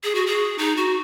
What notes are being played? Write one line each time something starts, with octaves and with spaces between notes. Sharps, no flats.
G#4
F#4
G#4
D#4
F#4